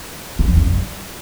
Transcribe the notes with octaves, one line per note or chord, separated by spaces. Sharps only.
C#3
E2
C#3
F#2
G3